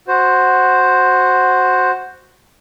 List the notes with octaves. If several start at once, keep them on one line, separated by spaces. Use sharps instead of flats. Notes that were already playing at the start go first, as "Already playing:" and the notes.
F#4 C5